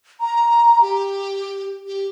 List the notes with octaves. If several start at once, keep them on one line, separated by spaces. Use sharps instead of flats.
A#5
G4
G4